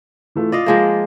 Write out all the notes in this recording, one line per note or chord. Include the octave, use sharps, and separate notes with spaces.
E3 A3 F4
F4 D5 D#5 F5
F3 G#3 A#3